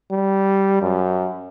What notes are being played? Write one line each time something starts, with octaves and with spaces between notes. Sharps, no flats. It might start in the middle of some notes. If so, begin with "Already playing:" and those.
G3
F#2